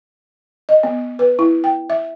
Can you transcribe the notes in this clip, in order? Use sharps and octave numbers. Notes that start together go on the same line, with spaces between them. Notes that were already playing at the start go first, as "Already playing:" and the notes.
D#5
B3
B4
E4
G5
E5